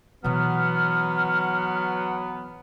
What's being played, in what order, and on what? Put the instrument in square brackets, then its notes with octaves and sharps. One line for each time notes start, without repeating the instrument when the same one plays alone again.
[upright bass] B2 E3 [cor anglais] F#3 [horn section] B3 [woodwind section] F6